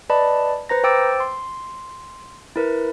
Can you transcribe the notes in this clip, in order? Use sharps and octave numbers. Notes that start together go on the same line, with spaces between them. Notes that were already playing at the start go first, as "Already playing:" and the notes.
B4 D5 D#5 A5 B5
B4 C5 A#5 A#6
C5 G5 D6 E6 A6 D7
C6
E4 A#4 B4